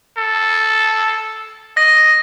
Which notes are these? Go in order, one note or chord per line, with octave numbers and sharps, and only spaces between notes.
A4
D#5 A#6